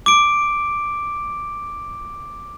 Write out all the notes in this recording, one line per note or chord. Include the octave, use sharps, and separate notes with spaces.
D6 D7